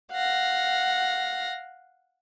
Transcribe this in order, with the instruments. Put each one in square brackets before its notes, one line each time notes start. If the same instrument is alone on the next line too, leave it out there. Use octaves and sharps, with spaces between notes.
[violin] F5 A#6 [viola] F#5